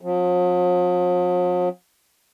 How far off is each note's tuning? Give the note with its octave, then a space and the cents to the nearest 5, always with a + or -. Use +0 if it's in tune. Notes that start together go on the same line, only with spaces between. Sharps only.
F3 +45 C4 +35